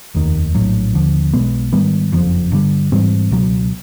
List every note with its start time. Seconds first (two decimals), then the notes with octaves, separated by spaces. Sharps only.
0.14 F1 D#2 D#3
0.55 A#1 A2 F#3
0.94 D#2 D3 F3
1.33 B1 B2 G#3 B3
1.73 G#2 D#3 G3 B3
2.12 F#1 F2 C#3 F3
2.52 G2 D3 G3
2.92 G#2 E3 G3 C4
3.31 C#2 B2 F#3